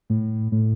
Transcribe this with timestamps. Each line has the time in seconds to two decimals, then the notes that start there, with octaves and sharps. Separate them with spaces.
0.10 A2
0.52 A2